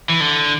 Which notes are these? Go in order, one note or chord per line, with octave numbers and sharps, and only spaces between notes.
E3
D3